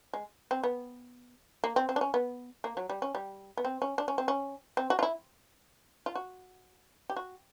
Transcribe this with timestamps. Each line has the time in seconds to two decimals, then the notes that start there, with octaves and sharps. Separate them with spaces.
0.13 G#3
0.51 C4
0.63 B3
1.64 A#3
1.76 C4
1.89 C4
1.96 D4
2.01 C#4
2.14 B3
2.64 A#3
2.77 F#3
2.90 G3
3.02 C#4
3.15 G3
3.57 B3
3.65 C4
3.82 C#4
3.98 D4
4.08 C#4
4.18 C4
4.28 C#4
4.77 C4
4.90 F#4
4.99 F4
5.03 E4
6.06 F4
6.15 F#4
7.10 G4
7.16 F#4